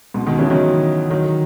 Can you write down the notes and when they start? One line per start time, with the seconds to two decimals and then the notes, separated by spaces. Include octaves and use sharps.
0.14 G#2 B2
0.26 B2 D#3
0.38 C#3 E3
0.50 D#3 F#3
1.10 D#3 F#3